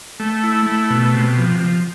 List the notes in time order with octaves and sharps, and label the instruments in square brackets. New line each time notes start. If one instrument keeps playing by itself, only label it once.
[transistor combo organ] A3
E4
A3
B2
C3
F3
F3